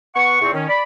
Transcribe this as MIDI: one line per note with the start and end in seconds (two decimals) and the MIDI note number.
0.15 0.41 59
0.15 0.41 78
0.15 0.41 85
0.41 0.51 40
0.41 0.51 46
0.41 0.51 60
0.41 0.51 85
0.54 0.66 51
0.54 0.66 61
0.69 0.82 74
0.69 0.82 83